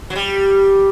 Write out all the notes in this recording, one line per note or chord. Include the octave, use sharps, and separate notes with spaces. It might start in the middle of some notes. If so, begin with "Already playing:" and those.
F#3
G3